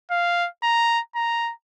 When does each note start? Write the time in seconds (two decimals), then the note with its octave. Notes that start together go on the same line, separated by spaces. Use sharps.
0.11 F5
0.63 A#5
1.15 A#5